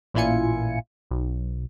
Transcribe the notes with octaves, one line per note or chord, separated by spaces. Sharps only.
A1 A#2 E4 F4 G#5 C#7
B1